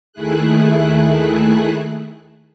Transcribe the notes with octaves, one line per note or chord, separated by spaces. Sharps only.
D#2 D#3 A3 E4 G#4 F#6